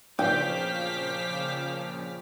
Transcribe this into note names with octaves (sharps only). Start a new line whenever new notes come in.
A#2 C#3 F3 C5 G5 D6 F6 B6